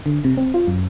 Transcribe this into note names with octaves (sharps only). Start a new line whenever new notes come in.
D3
C3
C4
F4
F#2